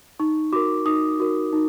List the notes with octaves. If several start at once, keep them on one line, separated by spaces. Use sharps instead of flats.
D#4 C#6
F#4 A#4 D6
D#4 D#6
F#4 A#4
D#4